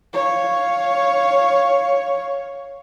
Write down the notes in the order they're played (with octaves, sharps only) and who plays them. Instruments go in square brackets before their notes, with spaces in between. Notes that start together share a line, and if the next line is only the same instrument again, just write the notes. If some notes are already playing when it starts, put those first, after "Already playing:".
[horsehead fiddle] C#5 F5